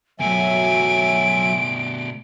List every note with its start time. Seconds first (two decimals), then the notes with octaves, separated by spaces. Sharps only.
0.20 B2 F#3 A3 E5 G#5 D7